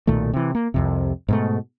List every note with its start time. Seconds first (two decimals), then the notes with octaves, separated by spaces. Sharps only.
0.07 B1 A#2 D#3 A3
0.33 C3 E3
0.55 A#3
0.74 C2 F2 C3
1.29 G#2 B2 A3